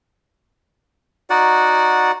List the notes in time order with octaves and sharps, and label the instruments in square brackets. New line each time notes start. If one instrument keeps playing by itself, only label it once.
[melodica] D#4 F#4 D5 F#5